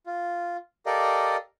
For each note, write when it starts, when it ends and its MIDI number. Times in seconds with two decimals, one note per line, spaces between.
0.06 0.57 65
0.86 1.36 67
0.86 1.36 69
0.86 1.36 70
0.86 1.36 74
0.86 1.36 75
0.86 1.36 77